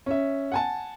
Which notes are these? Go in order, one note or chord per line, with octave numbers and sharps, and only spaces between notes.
C#4 E5
F#5 G#5 A5